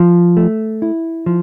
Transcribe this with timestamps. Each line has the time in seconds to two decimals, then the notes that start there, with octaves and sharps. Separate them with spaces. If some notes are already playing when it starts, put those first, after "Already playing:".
Already playing: F3
0.37 A3
0.82 E4
1.26 F3